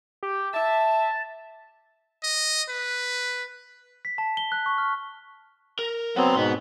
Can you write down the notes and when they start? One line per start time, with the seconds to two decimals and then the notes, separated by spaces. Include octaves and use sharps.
0.23 G4
0.54 E5 A5
2.23 D#5
2.69 B4
4.05 B6
4.18 A5
4.37 G7
4.52 F#6
4.66 C#6
4.78 F6
5.79 A#4
6.16 F#3 B3 C4 F#5 C6
6.36 G#2 B2 B3